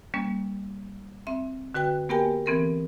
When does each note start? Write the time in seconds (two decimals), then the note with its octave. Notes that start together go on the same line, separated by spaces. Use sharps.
0.14 G3 A#3 C#4
1.27 C4 E5
1.74 D3 F#4 B4 G5 F#6
2.09 A#3 B3 G4 A#4 G5 G#5
2.46 E3 B3 C4 A4 A#4